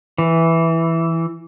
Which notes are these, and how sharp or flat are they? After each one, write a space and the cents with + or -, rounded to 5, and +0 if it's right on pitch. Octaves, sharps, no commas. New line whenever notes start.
E3 +0